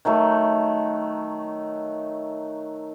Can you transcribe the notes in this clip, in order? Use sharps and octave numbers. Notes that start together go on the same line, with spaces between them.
D#3 F#3 A3